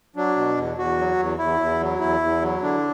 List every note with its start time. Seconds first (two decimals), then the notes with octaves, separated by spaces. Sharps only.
0.16 F#3 D4
0.36 B2
0.57 E2
0.78 E2 F#4
0.98 F#3
1.18 E2
1.39 E2 E4
1.60 E2
1.81 F#3
2.00 E2 E4
2.21 E2
2.42 F#3
2.62 D3 D4